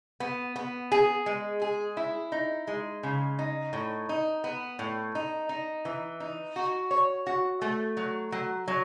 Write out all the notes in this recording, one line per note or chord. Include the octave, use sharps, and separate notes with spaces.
B3
B3
G#4
G#3
G#4
E4
D#4
G#3
C#3
D#4
A2
D#4
B3
A2
D#4
D#4
E3
D#4
F#4
C#5
F#4
A3
F#3
F#3
F#3